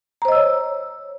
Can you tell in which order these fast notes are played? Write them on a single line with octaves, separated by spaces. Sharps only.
A#5 C5 D#5 E6 C#5